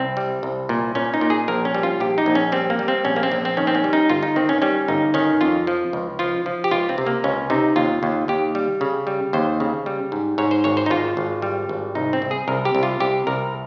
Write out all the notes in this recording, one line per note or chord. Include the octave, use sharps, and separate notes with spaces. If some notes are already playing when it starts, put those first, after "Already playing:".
Already playing: C2 C4
G3
C2
A#2
A#2 C#4
D#4
A#2
G#4
A#1 A#4
C#4
G3
F4
A#1 G4
D#4
A#1
C#4
G3 C4
A#3
G3
C4
A#1 C#4
A#3
C4
A#1
C4
D#3 C#4
C4
C#4
G3
D#4
G1 F4
D#4
D#3 C4
C#4
G3 C#4
G1 D#4
D#3 C#4
F2 F4
F3
C#2
F3 F4
F3
G4
C#2 F4
C4
C3
A#3
C#2 C#4
C3 D#4
D#2 F4
D#2
D#2 G4
G3
C#3
G3
D#2 C5
C#3
G3
G#2
G#2 C#5
C5
G#1 C#5
C5
D#4
G#1 F4
G#1
G3
G#1
C2 D#4
C4
C2
G#4
C2 A#4
G4
C2
F4
C2 G4
C2 A#4